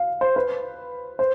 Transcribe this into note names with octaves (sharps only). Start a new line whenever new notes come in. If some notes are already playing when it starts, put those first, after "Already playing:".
Already playing: F5
C5
B4
C5